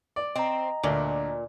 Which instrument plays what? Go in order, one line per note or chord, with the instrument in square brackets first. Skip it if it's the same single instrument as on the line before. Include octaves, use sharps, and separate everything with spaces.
[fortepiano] D5
[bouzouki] C4 [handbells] D#5 A#5
[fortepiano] D2 D4 [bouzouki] A#2